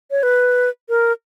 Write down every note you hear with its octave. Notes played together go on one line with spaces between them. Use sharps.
C#5
B4
A#4